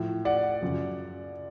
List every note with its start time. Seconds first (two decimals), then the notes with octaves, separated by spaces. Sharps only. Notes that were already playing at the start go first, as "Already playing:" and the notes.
Already playing: A2 F3
0.25 D5 F#5
0.61 F#2 C#3 F3